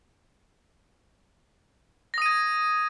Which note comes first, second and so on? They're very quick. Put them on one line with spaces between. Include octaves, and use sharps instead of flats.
A#6 D#6 D#7 G#6